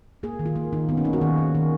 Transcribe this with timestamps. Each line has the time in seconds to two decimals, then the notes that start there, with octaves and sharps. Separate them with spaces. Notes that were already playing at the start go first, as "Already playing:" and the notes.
0.23 A#3 G#4
0.39 D#3
0.46 F4
0.56 A#3
0.73 D#3 D#4
0.89 D#3 B3
0.97 C#4
1.04 A#3 D#4
1.13 F#4
1.21 D#3 G#4
1.38 D#3
1.55 D#3